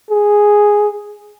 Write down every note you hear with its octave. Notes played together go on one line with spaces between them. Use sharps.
G#4